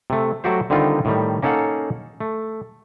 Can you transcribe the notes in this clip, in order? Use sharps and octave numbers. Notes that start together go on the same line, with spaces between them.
C3 A3
F#3 A3 F#4 G4 C5
D3 D#3 G3 C4 D#4 F4
A2 D#3 G3
A#3 C#4 D#4 A4 F5 F#5
A3